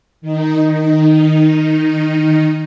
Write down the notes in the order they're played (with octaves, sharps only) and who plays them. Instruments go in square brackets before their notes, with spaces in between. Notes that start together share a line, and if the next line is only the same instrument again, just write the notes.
[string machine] D#3 D#4